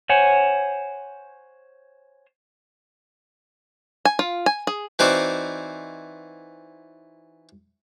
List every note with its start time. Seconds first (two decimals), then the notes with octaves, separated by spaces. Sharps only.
0.09 C5 C#5 F#5 G#5
4.05 G#5
4.19 F4
4.46 G#5
4.67 G#4
4.99 E3 C4 D#4 F#4 C5 D5